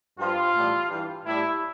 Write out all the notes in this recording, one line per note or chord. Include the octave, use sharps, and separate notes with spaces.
G2 F3 F4
A2 E3 G3
G2 E3 G3
A2 G3 E4